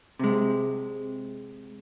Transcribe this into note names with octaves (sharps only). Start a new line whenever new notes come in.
C3 G#3